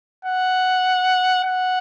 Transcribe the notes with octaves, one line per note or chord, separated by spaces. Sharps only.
F#5
F#5